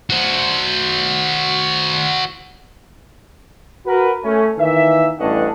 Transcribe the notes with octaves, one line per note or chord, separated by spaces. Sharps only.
F#4 C5
F#4 A#4 B4
A3 C#4
D#3 E3 A#3 E5
A1 G2 C#4 D4 D#5 F#5